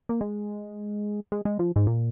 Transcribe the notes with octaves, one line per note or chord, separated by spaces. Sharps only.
A#3
G#3
G#3
G#3
F3
G#2
A#2